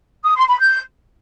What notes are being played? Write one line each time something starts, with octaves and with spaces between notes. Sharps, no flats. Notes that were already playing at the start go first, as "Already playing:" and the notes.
D#6
C6
B5
G6